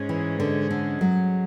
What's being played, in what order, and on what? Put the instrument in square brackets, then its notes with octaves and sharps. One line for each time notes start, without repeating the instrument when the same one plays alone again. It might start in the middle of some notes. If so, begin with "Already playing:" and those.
Already playing: [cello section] G#2 G#3 C#4 G#4
[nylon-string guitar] E3
D3
D3
F#3